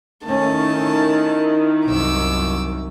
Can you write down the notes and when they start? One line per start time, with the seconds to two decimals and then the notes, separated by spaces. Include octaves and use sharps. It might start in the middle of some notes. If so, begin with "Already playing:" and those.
0.25 D#3 A3 C#4 E4 A5
1.86 C2 F#2 D6 E6